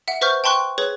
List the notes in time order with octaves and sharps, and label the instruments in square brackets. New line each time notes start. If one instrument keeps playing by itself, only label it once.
[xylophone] E5 F#5
B4 C5 E5 C#6 F6 G6
G5 A5 C6 C#6 F#6
G#4 B4 C#5